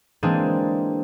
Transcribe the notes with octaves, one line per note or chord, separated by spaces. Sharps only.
E3 G#3 A#3 C4 D4 G#4